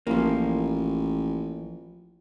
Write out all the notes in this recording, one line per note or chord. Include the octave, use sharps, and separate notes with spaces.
A1 F3 A#3